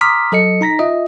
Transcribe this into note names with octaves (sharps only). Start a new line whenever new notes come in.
A#5 C6 D6 D#6 F6 B6
F#3 A4 D#5 C#7
D#4 A#5 A#6 B6
F4 D#5 E5